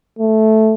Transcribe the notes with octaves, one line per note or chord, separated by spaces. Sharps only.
A3